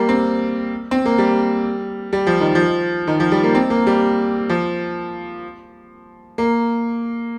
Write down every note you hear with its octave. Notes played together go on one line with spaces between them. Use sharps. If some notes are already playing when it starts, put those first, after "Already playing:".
Already playing: G3 A#3
C4
C4
A#3
G3
G3
F3
D#3
F3
D#3
F3
G3
A#3
C4
A#3
G3
F3
A#3